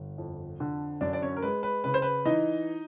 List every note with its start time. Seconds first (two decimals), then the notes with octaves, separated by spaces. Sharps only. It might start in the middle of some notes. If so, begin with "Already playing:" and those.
Already playing: G1
0.18 F2
0.60 D3
1.01 F#2 D4 D5
1.13 D5
1.22 C#4 C#5
1.36 A#4
1.42 G#3 B4
1.63 B4
1.84 C#3 B4
1.94 C5
2.02 B4
2.25 E3 D#4 D#5